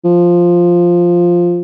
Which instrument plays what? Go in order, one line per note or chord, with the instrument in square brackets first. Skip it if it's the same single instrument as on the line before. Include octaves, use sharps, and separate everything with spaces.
[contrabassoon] F3